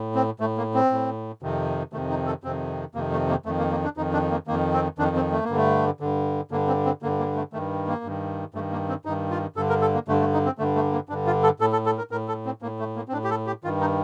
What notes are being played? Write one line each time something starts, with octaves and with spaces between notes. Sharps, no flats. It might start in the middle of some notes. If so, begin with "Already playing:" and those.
Already playing: A2
C4
A2 A3
A#3
C4
A2
F2 C3 D#3
F2 C3 D#3 A3
D#4
A4
F2 C3 D#3 C4
F2 C3 D#3 A#3
A3
A#3
F2 D#3 A3
A#3
A#3
D4
F2 D#3 D#4
D4
A#3
F2 D#3 A#3
C4
F2 D#3 D4
C4
A3
A#3
G2 D3
A3
G2 D3
G2 D3 A#3
C4
C4
G2 D3 A#3
A#3
A3
G2 D#3 A3
A#3
G2 D#3
G2 D#3 A3
A#3
C4
G2 D#3 D#4
F4
G2 D3 A4
A#4
A4
A#3
G2 D3 A3
A3
D#4
C4
G2 D3 A3
A3
A#3
G2 D3 D4
F4
A4
A2 A4
A4
A4
A#4
A2 A#4
A4
C4
A2 A#3
A3
A#3
C4
A2 D4
G4
A4
G4
G2 D#3 F4
D#4